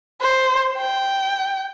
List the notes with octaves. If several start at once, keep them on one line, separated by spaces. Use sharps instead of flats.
C5
G5